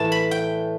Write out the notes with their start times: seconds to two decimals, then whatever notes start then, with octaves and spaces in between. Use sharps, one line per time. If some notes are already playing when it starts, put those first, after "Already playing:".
Already playing: A2 E3 A3 A5
0.12 B5
0.31 G5